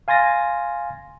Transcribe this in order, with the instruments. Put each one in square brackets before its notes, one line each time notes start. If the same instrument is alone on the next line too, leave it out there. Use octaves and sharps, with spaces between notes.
[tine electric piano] F5 G#5 C6 A6 A#6